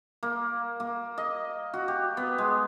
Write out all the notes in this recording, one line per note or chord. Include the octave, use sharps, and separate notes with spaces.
A#3
A#3
D#5
F#4
G4
B3
G#3